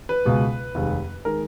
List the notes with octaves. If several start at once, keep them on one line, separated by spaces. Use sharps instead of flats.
B4
C#2 B2 G#3
F1 D#2 D#3 G#3
D#3 G#3 A#4